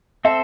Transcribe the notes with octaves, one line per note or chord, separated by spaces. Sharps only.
C4 A4 C5 E5